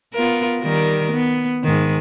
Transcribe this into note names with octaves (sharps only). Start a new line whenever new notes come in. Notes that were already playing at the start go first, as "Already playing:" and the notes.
B3 F4 A#4
D#3 G3 A#4
B3
G#2 D#3